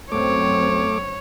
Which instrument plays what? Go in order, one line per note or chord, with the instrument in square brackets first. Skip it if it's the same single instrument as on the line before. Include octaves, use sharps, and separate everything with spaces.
[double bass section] F#2 F#3 C4 [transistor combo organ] A3 D6 [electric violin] C#5